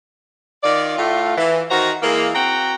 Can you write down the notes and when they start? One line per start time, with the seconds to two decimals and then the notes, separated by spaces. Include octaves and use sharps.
0.63 D#3 F4 D5
0.97 A2 A3 F4
1.37 E3
1.70 D#3 F#4 C5 A#5
2.02 E3 G#3 A#3
2.35 C4 F#4 F#5 G5 A#5